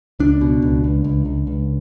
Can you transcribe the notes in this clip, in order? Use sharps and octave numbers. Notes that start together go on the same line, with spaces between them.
C#2 D4
B2
C#2
C#2
C#2
C#2
C#2